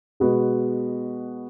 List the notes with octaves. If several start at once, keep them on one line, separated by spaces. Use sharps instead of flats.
B2 G#3 B3 F#4